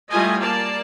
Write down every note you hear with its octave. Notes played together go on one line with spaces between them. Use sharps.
G3 A3 E4 F4 D#5 G#5
A#3 D5 A5